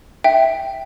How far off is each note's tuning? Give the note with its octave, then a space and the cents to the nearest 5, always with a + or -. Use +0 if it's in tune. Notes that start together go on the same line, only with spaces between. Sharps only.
E5 +0 G5 +0